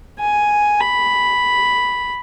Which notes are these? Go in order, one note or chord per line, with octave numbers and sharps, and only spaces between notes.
G#5
B5